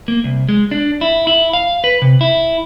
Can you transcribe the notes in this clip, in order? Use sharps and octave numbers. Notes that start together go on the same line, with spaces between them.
A#3
C2
G#3
D4
E4
E4
F5
B4
C3
E4